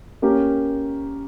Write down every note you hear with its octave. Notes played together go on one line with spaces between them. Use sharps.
A#3 C#4 G4 A#4